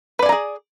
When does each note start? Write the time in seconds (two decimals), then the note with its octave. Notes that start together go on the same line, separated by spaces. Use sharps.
0.19 B4
0.22 D5
0.26 G#5
0.29 A#5
0.32 G#4